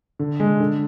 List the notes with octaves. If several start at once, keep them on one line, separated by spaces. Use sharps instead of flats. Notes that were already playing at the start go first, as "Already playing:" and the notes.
D3
G#3
D3